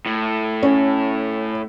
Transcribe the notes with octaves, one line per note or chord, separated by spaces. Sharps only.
A2
C#4